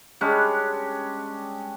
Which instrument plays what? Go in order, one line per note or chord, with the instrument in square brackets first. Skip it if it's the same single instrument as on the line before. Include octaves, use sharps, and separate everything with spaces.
[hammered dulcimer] G3 G#3 C#4 D4